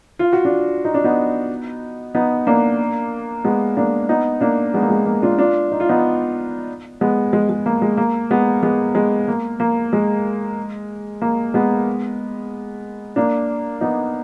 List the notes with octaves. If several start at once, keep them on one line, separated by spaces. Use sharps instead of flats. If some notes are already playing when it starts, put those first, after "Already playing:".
F4
F#4
D4 F4
D#4
D4
B3 D#4
B3 D#4
A#3 D4
G#3 B3
A#3 D4
B3 D#4
A#3 D4
G#3 B3
A#3
G#3
A#3
D4 F4
D4 F4
D#4
F4
B3 D#4
G#3 B3
G#3
G#3
A#3
G#3
A#3
G#3 B3
G#3 B3
G#3 B3
A#3
A#3
G#3
A#3
G#3 B3
A#3 D4
B3 D#4